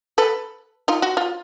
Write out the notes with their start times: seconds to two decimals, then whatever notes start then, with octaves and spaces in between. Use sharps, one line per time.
0.18 A4 B4
0.88 D#4 F4
1.02 F#4
1.17 F4